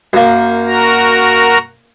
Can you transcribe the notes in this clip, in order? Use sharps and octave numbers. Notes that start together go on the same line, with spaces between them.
F#2 A#3
F#4 A#4 A#5